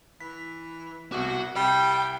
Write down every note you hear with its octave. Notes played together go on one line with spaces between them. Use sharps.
E3 B6
C2 B2 F#4 D6
C2 G3 G5